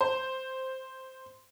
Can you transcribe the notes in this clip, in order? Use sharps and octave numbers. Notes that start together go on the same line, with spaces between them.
C5